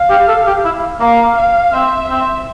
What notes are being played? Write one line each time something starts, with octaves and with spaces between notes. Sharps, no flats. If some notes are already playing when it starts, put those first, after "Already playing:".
Already playing: F5
G4
A4
G4
E4
A#3 F5
F5
C4 E5
C4